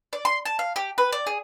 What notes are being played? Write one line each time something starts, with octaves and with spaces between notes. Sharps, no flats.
D5
C6
A5
F5
G4
B4
D5
G#4